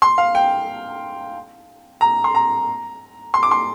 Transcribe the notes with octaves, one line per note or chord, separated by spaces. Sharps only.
C6
F5
G5
A#5
C6
A#5
C6
D6
C6